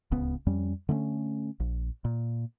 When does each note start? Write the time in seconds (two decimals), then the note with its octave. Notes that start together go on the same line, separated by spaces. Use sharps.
0.12 D1 C#2 C#3 B3
0.47 F2 G3 C#4
0.89 D3 A3 C4 C#4
1.60 A#1
2.05 A#2